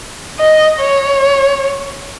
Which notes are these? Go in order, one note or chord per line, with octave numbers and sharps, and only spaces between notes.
D#5
C#5